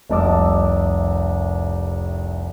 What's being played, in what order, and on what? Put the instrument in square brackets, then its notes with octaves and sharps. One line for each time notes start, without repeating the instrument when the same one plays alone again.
[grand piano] F1 C2 D#5 A5 D6 E6